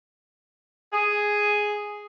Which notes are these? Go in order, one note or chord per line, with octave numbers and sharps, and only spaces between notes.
G#4